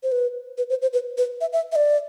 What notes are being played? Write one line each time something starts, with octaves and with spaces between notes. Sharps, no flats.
C5
B4
B4
C5
C5
B4
B4
E5
E5
E5
D5